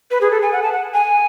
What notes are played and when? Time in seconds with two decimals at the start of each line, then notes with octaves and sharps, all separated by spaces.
0.11 B4
0.21 G#4
0.31 A4
0.42 G#5
0.52 F#5
0.63 A5
0.73 F#5
0.94 G#5